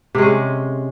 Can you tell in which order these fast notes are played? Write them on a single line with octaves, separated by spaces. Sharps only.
C3 G#3 C#4